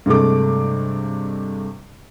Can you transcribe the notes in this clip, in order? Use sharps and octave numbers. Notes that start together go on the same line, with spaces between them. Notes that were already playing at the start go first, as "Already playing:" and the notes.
G2 C3 G#3 A3 D6